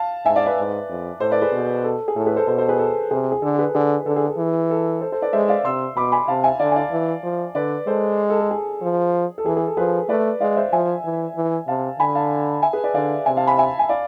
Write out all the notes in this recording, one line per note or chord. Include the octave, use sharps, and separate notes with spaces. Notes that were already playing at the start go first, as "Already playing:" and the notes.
Already playing: F5 A5
G#2 E5 G#5
D5 F5
B4 D5
G#2
F2
A2 A4 C5
B4 D5
G#4 B4
B2
A4
G#4
A2 A4
G#4 B4
A4 C5
B2 A4 C5
A4 C5
G#4 B4
A4
C3 G#4
G#4
D3 A4
G#4 B4
D3 G#4 B4
B4
D3 A4
G#4
G#4
E3
A4
A4 C5
A4 C5
B4 D5
G#3 C5 E5
D5 F5
C3 C6 E6
B2 B5 D6
G#5 B5
C3 F5 A5
E5 G#5
D3 D5 F5
G#5
D5 F5
E3
F3
D3 B4 D5
G#3 A4 C5
A4
A4
G#4
F3
A4
E3 G#4
G#4
A4
F3 G#4 B4
A3 B4 D5
G#3 D5 F5
C5 E5
F3 E5 G#5
E3
E3
C3 F5 A5
D3 G#5 B5
F5 A5
E5 G#5
G#4 B4
B4 D5
D3 D5 F5
C3 E5 G#5
F5 A5
G#5 B5
E5 G#5
G#5
D5 F5